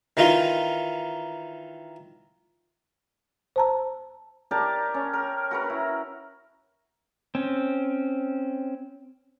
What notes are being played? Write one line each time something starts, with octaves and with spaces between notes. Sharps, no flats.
D#3 E3 D#4 F4
C5 A5 A#5
G4 A#4 D5 A5
C#4
A#4
F#4 A#4 B4
E4
C4 C#4